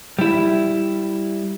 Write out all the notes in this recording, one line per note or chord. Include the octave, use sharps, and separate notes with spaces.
G3 E4